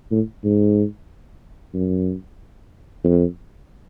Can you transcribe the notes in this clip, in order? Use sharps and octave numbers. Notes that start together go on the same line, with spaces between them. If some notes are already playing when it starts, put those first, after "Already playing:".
A2
G#2
F#2
F2